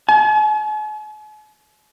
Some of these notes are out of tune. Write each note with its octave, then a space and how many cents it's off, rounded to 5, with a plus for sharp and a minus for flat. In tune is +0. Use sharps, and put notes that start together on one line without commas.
G#5 +45